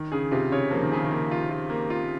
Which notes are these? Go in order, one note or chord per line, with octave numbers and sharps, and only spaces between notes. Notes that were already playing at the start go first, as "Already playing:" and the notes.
Already playing: D#3
C#3 G#4
C3 F4
C#3 C#5
F3 A#3
D#3
C#3 G#4
D#3
A#3
F4
F4
A#3
F4